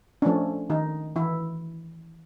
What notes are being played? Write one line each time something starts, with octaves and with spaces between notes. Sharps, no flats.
F3 A3 C#4 D4
D#3 D#4
E3 E4